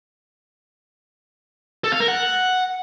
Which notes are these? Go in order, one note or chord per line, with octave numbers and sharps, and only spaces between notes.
A4
F5
A#4
F#5